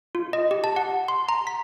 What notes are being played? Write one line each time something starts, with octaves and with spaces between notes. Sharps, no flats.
F4
D#5
G4
A5
F#5
C6
A#5
B6